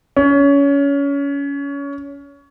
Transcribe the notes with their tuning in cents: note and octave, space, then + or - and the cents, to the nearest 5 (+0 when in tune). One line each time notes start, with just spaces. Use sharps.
C#4 +25